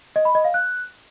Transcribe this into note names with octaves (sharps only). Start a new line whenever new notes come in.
D#5
B5
D#5
F5
F#6